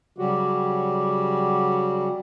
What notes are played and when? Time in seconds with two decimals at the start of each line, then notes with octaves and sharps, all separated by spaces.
0.18 C#3 F#3 G3 F#4 G4